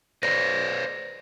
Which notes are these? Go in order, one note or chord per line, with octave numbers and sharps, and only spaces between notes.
B4 C5 D5 A#6